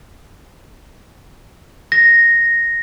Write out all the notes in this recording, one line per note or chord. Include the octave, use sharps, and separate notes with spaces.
A#6